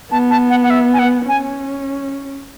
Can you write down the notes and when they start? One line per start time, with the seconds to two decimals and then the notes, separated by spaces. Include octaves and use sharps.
0.11 B3 A5
0.30 A5
0.50 F#5
0.63 F#5
0.70 E5
0.93 G#5
0.99 F#5
1.27 C#4 G#5